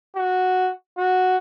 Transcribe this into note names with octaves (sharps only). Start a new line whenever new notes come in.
F#4
F#4